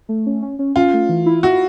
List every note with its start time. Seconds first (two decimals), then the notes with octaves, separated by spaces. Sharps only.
0.09 A3
0.26 C#4
0.42 C#4
0.59 C#4
0.76 C#4 F4
0.94 A3
1.09 E3
1.26 E4
1.43 E4 F#4